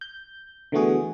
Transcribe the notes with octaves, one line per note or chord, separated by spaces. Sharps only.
G6
D3 E3 A3 B3 F#4 G#4